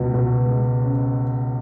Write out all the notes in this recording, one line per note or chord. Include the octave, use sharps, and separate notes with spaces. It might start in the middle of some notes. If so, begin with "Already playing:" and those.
Already playing: C#2 B2
B2
G#3
C#4